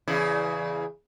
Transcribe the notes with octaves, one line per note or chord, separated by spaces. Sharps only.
E2 C#3 E4